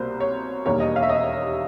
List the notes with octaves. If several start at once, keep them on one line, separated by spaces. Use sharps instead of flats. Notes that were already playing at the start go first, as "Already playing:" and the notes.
Already playing: C2 B2 G3 A#3 C5
C#5
E1 D#2 D#3 G3 A#3 C#5
D#5
F5
E5
D#5
E5